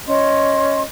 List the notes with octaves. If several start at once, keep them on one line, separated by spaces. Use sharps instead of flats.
C#4 D#5 C6